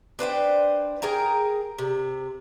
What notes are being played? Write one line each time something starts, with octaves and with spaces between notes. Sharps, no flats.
D4 B4 C5 G5
G#4 A#4 G5 A#5
C3